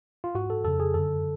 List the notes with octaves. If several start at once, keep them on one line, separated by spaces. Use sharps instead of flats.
F4
G#2 F#4
A4
F2 C#3 A4
G#4
F#2 D3 A4